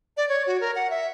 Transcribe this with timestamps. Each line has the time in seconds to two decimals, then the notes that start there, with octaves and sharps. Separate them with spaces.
0.17 D5
0.29 C#5
0.47 F#4
0.61 A#4
0.75 F#5
0.90 E5